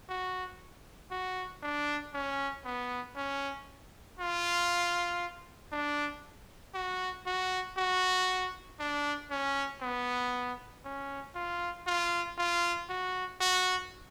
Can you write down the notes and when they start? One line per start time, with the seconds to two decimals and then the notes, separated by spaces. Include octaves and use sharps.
0.09 F#4
1.11 F#4
1.63 D4
2.14 C#4
2.65 B3
3.16 C#4
4.19 F4
5.72 D4
6.75 F#4
7.26 F#4
7.78 F#4
8.80 D4
9.31 C#4
9.81 B3
10.84 C#4
11.35 F4
11.87 F4
12.38 F4
12.89 F#4
13.41 F#4